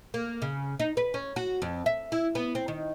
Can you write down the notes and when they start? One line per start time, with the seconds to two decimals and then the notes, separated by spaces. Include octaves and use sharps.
0.14 A#3
0.42 C#3
0.80 D#4
0.97 B4
1.14 C#4
1.36 F#4
1.62 F2
1.86 E5
2.12 E4
2.35 B3
2.55 C4
2.68 D#3